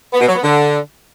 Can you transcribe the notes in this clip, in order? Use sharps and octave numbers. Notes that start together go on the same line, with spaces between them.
B3
B2
F#3
B3
D3